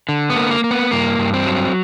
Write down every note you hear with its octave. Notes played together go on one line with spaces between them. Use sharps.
D3
B3
A#3
A#3
A#3
B3
G2 A#3
G2
C4
F#3